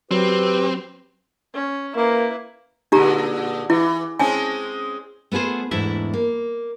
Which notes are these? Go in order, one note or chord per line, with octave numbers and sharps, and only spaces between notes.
F#3 C4 G4 B4
C#4
A#3 E4 B4
A#2 D3 G#3 D#4 G4 A#5
E3 E4
G#3 C4 C#4 G#5 A5
A3 B3 F4 G#4 C5
E2 G#2 A3 D4 E4 E5
A#3